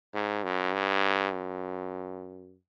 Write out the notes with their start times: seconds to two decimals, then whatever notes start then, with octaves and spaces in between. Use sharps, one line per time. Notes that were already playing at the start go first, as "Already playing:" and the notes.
0.14 G#2
0.44 F#2
0.74 G2
1.33 F#2